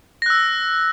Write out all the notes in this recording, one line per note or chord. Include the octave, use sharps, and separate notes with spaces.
E6 F#6 A#6